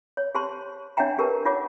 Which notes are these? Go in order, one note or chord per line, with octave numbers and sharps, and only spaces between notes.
C#5
G4 C5 A5 C6
D4 C#5 E5 F#5 G5 A#5
D4 G4 A#4 B4 A5
D#4 F4 C#5 F#5 D6